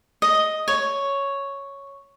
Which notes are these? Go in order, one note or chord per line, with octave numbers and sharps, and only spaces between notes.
D#5
C#5